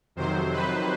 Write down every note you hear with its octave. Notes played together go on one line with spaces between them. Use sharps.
F2 C3 D#3 F#3 C5
B4